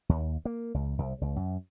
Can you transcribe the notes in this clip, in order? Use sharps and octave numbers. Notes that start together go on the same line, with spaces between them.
D#2
A#3
C#2
C2
C#2
F#2